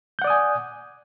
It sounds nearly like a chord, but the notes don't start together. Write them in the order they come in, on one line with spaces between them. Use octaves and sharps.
G6 F#5 D5 D#6 G#5